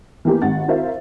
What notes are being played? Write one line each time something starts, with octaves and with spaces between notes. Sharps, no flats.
E3 A#3 B3 G4 A#4
G#1 F#5 A6
E4 F#4 A#4 C5 E5 F5